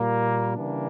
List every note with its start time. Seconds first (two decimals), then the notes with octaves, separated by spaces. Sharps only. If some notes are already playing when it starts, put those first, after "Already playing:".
Already playing: A#2 G3 A#3
0.56 C#3 E3 G3 A#3 D4